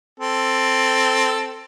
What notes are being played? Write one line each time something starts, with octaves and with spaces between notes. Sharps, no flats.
C4 A4